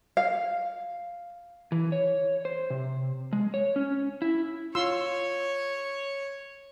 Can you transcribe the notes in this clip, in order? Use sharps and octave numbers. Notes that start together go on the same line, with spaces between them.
F5
E3
C#5
C5
C3
G#3
C#5
C#4
E4
F4 C#5 C6 E6